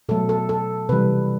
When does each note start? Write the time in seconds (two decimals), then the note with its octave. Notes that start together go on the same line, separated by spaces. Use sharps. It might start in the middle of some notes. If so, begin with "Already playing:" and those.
0.09 B2 F#3 A3 A4
0.29 A4
0.49 A4
0.89 C3 E3 G3 B4